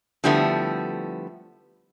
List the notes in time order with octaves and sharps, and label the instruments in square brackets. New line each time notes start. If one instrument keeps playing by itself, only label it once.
[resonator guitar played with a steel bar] D3 F3 G3 A3 B3 E4